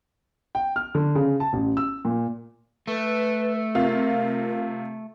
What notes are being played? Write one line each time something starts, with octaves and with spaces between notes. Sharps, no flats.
G5
F6
D3
C#3
A5
A1
E6
A#2
A3 B4
C3 F4 A#4